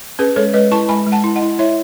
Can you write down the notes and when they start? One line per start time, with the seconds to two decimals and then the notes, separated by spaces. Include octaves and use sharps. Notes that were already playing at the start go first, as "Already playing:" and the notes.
0.19 C#4 G#4 B4
0.36 G#3 A4 C#5
0.54 G#3 B4 D#5
0.71 E4 A5 C#6
0.89 G#3 G#5 B5
1.07 G#3
1.12 F#5 A5
1.24 E4
1.36 D#5 F#5
1.42 E4
1.59 E4 C#5 E5